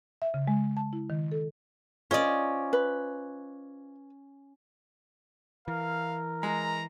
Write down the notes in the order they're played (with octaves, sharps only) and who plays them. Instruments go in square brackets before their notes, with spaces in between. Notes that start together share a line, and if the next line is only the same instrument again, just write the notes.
[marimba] E5
C#3
G#3
A5
E4
D#3
A4
[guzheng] C#4 D5 [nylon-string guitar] F4 C5 D#5
[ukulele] B4
[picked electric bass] E3 [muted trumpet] A#4 [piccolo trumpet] F5
[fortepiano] G#3 [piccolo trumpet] A#5